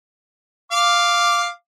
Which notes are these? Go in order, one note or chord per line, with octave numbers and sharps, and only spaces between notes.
F5 D6